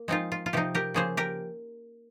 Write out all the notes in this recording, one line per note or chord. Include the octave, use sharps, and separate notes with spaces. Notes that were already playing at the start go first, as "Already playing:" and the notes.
Already playing: A#3
F3 G#3 C4 D#4 F4
F4
F4
C3 F3 C4 D#4 G4
G4 A#4
C#3 F3 A#3 G#4 C5
G4 A#4